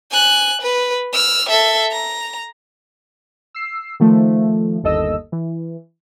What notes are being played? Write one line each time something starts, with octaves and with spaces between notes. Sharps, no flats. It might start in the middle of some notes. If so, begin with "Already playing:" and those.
G#5 F#6
B4
E6 F6
A4 E5
A#5
E6 C7
D#3 F3 A3
G1 D#2 A4 D#5 E6
E3